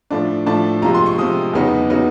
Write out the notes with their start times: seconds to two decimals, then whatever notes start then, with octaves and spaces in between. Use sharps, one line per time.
0.10 A2 F3 A3 D4
0.46 A2 F3 A3 D4 A5
0.82 C3 F3 G#3 A#5
0.94 C6
1.06 C#6
1.18 C3 F3 G#3 D#6
1.54 E2 C#3 F#3 B3 D#4
1.90 C#3 F#3 B3 D#4